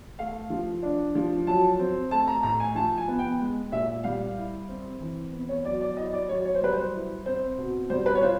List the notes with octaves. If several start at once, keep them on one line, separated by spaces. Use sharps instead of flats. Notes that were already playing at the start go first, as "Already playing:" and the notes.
A3 F5
F3
D4
F3
F#3 A5
C4
A3 A5
A#5
A2 A#5
G#5
F3 A5
G#5
B3
G5
G#3
A#2 E5
G3 F5
E4
C4
E3
B3
C#5
F#3 D5
D5
E4 D#5
D5
F#3 C#5
C#5
C5
G3 B4
C5
E4
C4 C5
B2
G3 C5
B4
C#5
F4 C5